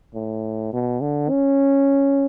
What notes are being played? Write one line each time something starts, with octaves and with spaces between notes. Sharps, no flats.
A2
B2
D3
C#4